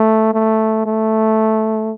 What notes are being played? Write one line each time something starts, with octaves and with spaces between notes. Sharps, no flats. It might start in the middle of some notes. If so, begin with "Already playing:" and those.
Already playing: A3
A3
A3